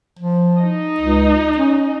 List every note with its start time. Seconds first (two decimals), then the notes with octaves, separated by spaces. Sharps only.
0.19 F3
0.59 D#4 D#5
1.00 C#2
1.57 C#4